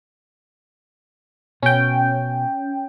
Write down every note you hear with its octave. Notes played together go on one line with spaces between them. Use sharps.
B2 C#4 G5